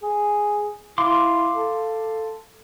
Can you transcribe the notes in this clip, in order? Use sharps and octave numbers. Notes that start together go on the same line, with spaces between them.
G#4
E4 F5 C6 D6
A4